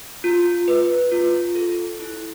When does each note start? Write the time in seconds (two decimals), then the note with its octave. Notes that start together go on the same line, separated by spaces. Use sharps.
0.24 F4
0.68 B4
1.12 F4
1.55 A4
2.00 E4